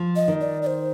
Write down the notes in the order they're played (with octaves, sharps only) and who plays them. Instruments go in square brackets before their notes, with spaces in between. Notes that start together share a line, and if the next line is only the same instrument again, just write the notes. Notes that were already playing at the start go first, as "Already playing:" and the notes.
Already playing: [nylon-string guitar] F3
[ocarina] D#5
[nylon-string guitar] D#3
[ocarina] D5
D5
C5